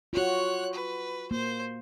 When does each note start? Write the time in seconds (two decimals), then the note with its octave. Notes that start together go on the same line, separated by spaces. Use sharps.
0.13 F4 F#4 C#5 F#6
0.73 B4
1.31 A#3 C5